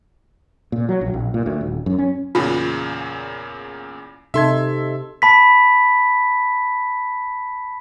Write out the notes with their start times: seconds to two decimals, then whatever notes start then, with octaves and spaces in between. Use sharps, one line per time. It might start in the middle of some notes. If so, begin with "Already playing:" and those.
0.72 A#2
0.89 F#3
1.01 A#1
1.14 A#1
1.34 A#2
1.46 D2
1.61 D#1
1.86 F#2
1.98 C#4
2.35 E2 A#2 C#3 F4
4.34 C3 D#4 A4 E5 C6 G#6
5.22 A5 B5 B6